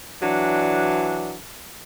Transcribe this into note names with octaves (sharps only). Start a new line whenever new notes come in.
E3 F#3 D4